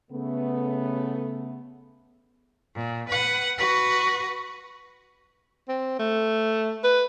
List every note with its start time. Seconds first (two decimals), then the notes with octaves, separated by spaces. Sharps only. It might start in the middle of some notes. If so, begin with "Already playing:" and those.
0.11 C#3 A3 B3
2.75 A#2
3.09 B4 F#5
3.58 F#4 B4
5.68 C4
5.99 A3
6.84 B4